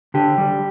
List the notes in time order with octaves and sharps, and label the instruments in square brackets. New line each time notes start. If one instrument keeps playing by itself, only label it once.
[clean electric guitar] D3 G4
G3